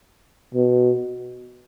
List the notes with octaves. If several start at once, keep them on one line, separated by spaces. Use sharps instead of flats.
B2